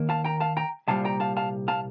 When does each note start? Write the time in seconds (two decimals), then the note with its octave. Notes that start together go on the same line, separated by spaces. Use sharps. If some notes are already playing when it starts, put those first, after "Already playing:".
Already playing: D#2 D#3 A#3
0.09 F5 A5
0.24 G5 A#5
0.40 F5 A5
0.57 G5 A#5
0.88 C2 A#2 G3 F5 A5
1.05 G5 A#5
1.20 F5 A5
1.37 F5 A5
1.68 F5 A5